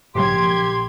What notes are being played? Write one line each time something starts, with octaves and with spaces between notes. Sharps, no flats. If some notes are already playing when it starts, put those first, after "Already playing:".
A#1 G#2 C#3 F#3 G4 C6 G#6